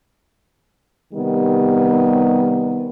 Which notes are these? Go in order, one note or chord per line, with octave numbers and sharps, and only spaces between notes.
C3 D#3 G3 B3